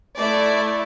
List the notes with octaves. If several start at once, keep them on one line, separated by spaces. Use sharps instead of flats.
A3 E4 D5